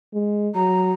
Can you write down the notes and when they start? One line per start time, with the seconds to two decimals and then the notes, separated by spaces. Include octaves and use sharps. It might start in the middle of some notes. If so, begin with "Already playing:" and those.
0.13 G#3
0.55 F#3 A#5